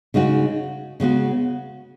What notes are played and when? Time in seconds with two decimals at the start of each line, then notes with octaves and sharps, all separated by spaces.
0.14 C#3 G#3 D#4 F#4
1.00 C#3 G#3 B3 F#4